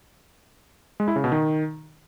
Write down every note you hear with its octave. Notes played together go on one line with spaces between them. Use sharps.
G#3
E4
C#3
B2
D#3